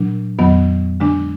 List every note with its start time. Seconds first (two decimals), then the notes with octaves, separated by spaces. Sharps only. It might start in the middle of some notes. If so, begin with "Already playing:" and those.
Already playing: A#2 F#3 D4
0.39 F2 D#3 F#3 B3
1.00 D3 G#3 D4